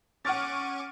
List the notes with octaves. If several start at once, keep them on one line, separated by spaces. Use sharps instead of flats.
C#4 F#5 C#6 D6 F6 A6 D#7